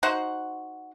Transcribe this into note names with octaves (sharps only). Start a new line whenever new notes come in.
D#4 F#4 C5 F#5